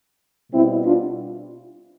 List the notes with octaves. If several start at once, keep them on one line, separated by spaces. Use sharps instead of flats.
B2 G3 C4 E4
D4 F4